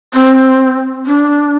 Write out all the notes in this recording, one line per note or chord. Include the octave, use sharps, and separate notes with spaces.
C4
D4